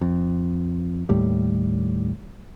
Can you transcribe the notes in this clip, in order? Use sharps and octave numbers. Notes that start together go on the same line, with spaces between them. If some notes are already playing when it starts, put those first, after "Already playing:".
F2
D#2 A2 G3